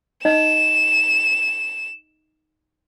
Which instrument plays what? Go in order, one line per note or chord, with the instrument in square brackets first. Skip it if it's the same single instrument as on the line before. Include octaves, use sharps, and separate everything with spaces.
[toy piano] D#4 D#5 [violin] E7